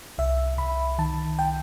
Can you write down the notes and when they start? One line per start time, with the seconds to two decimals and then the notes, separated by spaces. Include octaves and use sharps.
0.18 C2 E5
0.58 C2 B5
0.99 D#3 A5
1.39 G5